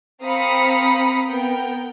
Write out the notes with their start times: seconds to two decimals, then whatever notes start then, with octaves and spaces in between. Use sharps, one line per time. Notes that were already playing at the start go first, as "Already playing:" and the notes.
0.23 C4 F5 A#5 B5 D#6 C#7
1.29 B3 A#4 G5